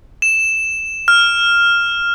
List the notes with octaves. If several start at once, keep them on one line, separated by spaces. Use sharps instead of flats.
E7
F6